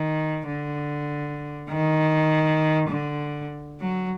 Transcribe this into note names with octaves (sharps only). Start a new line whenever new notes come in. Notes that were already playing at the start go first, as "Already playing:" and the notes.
Already playing: D#3
D3
D#3
D3
F#3